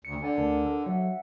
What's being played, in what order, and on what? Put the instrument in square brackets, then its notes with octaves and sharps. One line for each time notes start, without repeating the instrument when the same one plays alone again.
[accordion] D2 [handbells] C#7
[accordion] D3 [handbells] D5 G#5 C#7
[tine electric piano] D2 [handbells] A#4 A5
[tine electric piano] A4
[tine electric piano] F#3 [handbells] E5 F#5